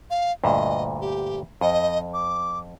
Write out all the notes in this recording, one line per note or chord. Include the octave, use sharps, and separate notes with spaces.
F5
D2 G2 A#2 D#5
G4
F2 D#5
D6